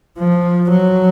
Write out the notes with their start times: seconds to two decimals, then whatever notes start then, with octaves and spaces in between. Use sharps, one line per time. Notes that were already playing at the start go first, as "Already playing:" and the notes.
0.19 F3
0.71 F#3